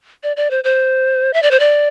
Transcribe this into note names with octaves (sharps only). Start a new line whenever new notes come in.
D5
D5
C5
C5
E5
D5
C5
D5